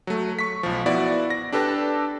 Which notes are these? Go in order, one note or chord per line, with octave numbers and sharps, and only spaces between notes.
F#3 A3
C#6 B6
B1 F3
B3 E4 F#4 D5
A#6
D4 G4 A4 B4 A5